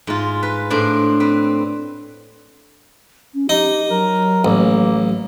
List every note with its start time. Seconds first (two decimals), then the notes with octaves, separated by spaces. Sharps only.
0.07 G#2 F4
0.43 B4
0.70 A2 D4 C5
1.20 C4 B4
3.34 C#4
3.49 D#4 G4
3.90 F#3 A#4
4.45 A1 A#3